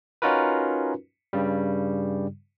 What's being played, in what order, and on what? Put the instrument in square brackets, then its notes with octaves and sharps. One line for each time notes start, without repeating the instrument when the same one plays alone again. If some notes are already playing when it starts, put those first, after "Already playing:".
[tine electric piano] C#4 D#4 F4 F#4 A#4 B4
G2 C#3 G3